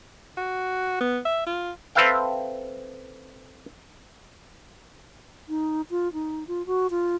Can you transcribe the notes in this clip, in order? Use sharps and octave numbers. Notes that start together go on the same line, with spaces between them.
F#4
B3
E5
F4
C4 A4 B4 E5 F5 G5
D#4
F4
D#4
F4
F#4
F4